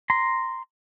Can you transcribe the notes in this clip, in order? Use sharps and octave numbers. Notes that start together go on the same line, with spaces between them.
A#5 C6